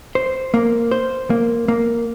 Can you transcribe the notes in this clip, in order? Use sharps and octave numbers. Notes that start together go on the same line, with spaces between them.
C5
A#3
C5
A#3
A#3